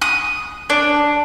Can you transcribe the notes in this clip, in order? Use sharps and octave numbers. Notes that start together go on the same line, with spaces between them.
D#6
D4